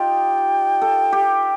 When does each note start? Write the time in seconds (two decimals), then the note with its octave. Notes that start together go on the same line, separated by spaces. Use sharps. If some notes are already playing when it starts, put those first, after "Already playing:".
Already playing: D#4 F4 G4 G5
0.82 A4
1.12 G4